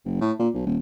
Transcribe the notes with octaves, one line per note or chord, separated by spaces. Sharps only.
F#1
A2
A#2
B1
D#1